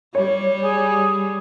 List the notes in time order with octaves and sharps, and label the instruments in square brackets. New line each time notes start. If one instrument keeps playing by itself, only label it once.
[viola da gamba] G3 [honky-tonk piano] C#5
[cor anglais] G#4